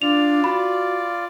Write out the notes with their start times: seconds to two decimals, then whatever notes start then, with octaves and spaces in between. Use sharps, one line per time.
0.02 D4 F4 D5 F7
0.44 F#4 B5